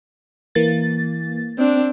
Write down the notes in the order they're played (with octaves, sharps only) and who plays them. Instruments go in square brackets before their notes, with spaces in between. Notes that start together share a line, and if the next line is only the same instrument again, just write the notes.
[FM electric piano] E3 A#3 A6
[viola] C4 D4